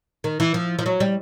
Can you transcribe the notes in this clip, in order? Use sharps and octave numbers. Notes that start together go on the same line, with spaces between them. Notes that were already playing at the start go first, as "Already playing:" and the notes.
D#3
E3
F3
F3
F#3
G3